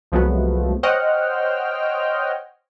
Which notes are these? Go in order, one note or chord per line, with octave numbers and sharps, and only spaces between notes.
C2 F3 F#3 G#3 A3 B3
C5 C#5 D#5 F#5 G5 F6